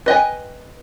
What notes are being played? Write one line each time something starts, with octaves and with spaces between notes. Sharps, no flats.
B4 D#5 G5 G#5